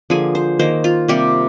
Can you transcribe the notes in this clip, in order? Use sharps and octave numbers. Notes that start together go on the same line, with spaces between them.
D3 F3 A#3 G#4
C5
D#3 A#3 C5
F4
C3 G3 A#3 G4